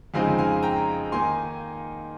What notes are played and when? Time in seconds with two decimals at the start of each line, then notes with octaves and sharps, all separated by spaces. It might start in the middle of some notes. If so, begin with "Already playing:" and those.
0.14 F2 C#3 G#3 C4 D#4 F5 G#5
0.38 F5 G#5
0.63 G5 A#5
1.12 D#3 A#3 D#4 G#5 C6